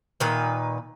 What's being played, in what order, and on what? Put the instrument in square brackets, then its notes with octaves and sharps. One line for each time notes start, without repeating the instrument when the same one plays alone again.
[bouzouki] A#2 D#3 B4